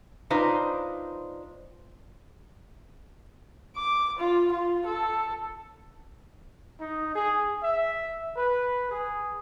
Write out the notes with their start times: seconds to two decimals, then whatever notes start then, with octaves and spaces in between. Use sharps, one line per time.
0.30 D4 D#4 F4 B4 C5
3.76 D6
4.18 F4
4.52 F4
4.86 A4
6.79 D#4
7.14 G#4
7.61 E5
8.36 B4
8.90 G#4